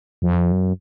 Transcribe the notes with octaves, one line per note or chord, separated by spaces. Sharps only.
F2
F#2